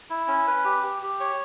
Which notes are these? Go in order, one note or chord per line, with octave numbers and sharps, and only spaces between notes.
E4
C#4
B4
G4
G4
G4
C#5